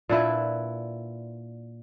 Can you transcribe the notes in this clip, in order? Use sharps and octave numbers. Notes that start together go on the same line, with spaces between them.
A#2 D4 E4 B4